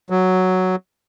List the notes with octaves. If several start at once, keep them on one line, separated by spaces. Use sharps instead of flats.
F#3